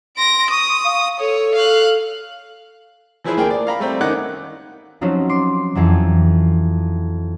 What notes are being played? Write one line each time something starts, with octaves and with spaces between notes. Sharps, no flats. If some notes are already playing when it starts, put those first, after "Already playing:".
C6 A#6 D7
C#6 D#6
F5
A4 C#5
F5 F#6
E3 F3 E4 G#4 B4 C5
D2 A#3 G#4 A#4 G5
D5
F5 A#5 B5
G3 A3 C4
D#3 C#4 D#5 F#5 D6 F#6
F3 F#3 C4 C#4 D#4 F#4
C6 D6
F2 E3 F#3